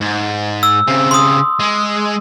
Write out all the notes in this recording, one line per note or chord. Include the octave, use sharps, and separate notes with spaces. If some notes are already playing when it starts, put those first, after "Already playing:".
G#2
E6
C#3 C4
C6 D#6
G#3